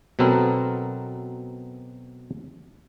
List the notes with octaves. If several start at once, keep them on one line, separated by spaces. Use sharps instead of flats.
B2 F#3 B3 C4 A4 A#4